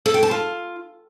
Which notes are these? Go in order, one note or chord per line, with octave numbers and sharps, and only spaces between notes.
A4
G5
A5
F4